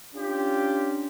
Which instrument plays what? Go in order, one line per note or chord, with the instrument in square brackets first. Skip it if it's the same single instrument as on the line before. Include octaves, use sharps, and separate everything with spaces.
[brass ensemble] C#4 D4 F4 G4